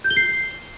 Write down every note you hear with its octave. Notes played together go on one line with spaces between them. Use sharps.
G6
G7
C7